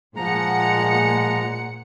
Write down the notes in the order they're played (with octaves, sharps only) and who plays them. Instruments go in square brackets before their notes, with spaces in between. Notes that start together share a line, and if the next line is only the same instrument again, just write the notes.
[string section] A#2 F#5 C#7 [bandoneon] F3 A#5 [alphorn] G#3